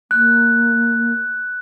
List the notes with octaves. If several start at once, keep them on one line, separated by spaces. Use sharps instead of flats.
A#3 F#6